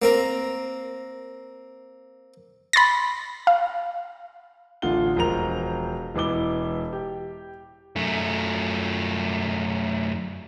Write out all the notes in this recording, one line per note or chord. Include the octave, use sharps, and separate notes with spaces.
A#3 C4 A#4
B5 C6 A6 A#6
F5
A1 D3 F4 F#5 G7
E1 F3 A#4 A#5 F7
E1 E3 E4 D6 G7
G4
F#2 A3